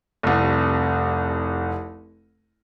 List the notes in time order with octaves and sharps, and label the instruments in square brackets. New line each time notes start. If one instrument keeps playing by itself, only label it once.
[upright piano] F1 C2